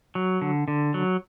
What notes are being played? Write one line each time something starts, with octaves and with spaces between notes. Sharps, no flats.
F#3
D3
D3
F#3